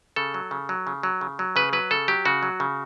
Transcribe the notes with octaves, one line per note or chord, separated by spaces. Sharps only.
C#3 A4
F#3
C#3
F#3
C#3
F#3
C#3
F#3
C#3 B4
F#3 B4
C#3 A4
F#3 G4
C#3 F#4
F#3
C#3